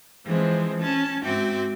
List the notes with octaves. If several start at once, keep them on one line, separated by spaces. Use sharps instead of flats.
E3 F3 G#3 C4
C#4 A5
G#2 C4 F#4 E5 G5 D6